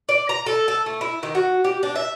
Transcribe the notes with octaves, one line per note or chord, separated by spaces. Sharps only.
D5
A#5
A4
A4
A3
E4
D#3
F#4
G4
D4
E5